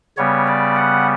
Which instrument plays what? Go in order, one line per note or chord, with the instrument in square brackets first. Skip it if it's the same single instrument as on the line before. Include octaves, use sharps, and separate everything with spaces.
[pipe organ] C#3 G3 B3 C#5
D5
F#5